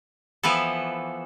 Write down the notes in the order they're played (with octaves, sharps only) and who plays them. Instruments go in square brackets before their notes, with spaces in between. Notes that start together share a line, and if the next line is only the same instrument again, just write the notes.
[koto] E3 F3 B3 A4